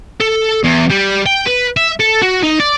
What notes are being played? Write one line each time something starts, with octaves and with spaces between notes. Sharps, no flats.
A4
E2
G3
G5
B4
E5
A4
F#4
D#4
D5